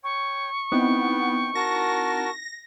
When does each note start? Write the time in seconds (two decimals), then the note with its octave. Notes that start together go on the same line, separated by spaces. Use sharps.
0.04 C#5 G5 C#6
0.72 B3 C4 D#4 E4 G5
1.55 F#4 A#4 A5 A#6